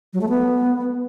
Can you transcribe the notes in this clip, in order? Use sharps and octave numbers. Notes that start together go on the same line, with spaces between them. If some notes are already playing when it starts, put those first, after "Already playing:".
F#3
A3
B3